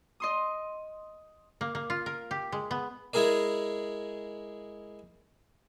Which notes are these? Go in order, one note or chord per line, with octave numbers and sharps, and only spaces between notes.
D#5 C6 D#6
A#3
A#3
F4
A#4
G4
G#3
B3
G#3 E4 G#4 A#4 D5